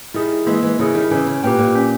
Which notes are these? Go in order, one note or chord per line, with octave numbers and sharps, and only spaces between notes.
D#3 G3 E4 G#4
E3 G#3 A#3
E3 G#3
C#3 E3 E4 G#4
D#3 G3
C#3 E3 C#4
C#3
A#2 G4 B4 G5
A#2
C#4